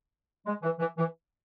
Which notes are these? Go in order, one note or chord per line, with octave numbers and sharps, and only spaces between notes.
G#3
E3
E3
E3